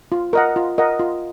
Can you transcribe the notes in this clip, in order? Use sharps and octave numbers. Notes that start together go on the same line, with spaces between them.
F4
A#4 D#5 F#5
F4
A#4 D#5 F#5
F4